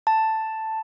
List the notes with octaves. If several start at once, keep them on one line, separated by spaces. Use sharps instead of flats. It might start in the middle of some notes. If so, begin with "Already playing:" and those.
A5